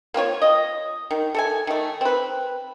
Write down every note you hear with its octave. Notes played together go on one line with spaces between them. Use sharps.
A#3 C4 F4 C#5
D#5
D#3
A4 E5 G#5
D#3 A3
C4 B4